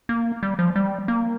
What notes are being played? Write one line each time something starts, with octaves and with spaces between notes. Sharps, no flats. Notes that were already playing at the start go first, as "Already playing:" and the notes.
A#3
G3
F3
G3
A#3